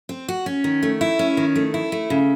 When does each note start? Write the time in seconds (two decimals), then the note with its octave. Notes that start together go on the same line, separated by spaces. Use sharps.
0.09 C4
0.29 F#4
0.46 C#4
0.64 D#3
0.83 A3
1.01 E4
1.19 C#4
1.37 D#3
1.56 A3
1.74 E4
1.92 A3
2.10 C#3